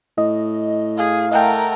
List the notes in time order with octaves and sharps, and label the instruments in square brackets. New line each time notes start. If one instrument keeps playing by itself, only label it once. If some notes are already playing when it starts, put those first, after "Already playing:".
[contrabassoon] A2 [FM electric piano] D#5
[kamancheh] G#4 [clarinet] F5
[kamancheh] A3 A#4 [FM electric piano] D#5 F#5 G5